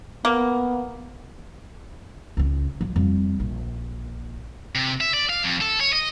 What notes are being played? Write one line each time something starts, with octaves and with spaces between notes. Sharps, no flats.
A#3 B3
C#2 C#4
F3 F#3
F2 G3
A#1
C3
E5
D5
F5
F2
A4
C#5
D#5